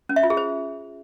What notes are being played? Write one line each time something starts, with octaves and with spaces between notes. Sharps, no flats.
C#4
E5
F4
G#4
C5